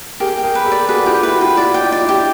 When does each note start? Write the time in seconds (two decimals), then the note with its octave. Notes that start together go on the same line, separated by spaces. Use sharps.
0.20 G4 G#4 A#4
0.38 G5
0.43 G#4 A#4
0.55 B4
0.66 G4 A4
0.71 D5
0.89 F#4 G#4 B4
1.06 F4 G4 G5
1.23 E4 F#4 B4
1.41 F4 G4 B4
1.57 E4 F#4 D5
1.74 G5
1.81 D#4 F4
1.92 D5
2.03 D4 E4
2.09 G4